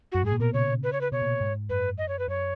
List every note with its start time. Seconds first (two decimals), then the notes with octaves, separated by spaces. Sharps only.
0.12 F#2 F#4
0.23 G#2 G#4
0.32 A#2
0.40 B2 A#4
0.53 C#3 C#5
0.83 B4
0.93 C#5
1.01 B4
1.12 B2 C#5
1.22 A#2
1.41 G#2
1.69 F#2 B4
1.98 D#5
2.08 C#5
2.19 B4
2.28 F#2 C#5